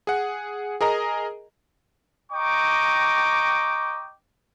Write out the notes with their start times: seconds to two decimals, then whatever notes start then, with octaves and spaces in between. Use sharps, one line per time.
0.07 G#4 F#5
0.81 G#4 A#4 D#5 A#5
2.32 D#5 G5 A#5 C#6 D6